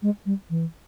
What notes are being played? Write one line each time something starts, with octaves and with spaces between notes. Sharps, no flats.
G#3
G3
E3